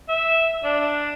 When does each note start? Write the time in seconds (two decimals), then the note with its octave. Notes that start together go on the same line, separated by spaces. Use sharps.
0.09 E5
0.64 D4